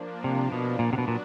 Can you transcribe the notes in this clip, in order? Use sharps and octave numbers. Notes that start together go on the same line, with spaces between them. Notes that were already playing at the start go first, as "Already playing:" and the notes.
Already playing: F3 A#3 D4
C3
B2
A#2 F#3 B3 D4 F#4
C3
B2
A#2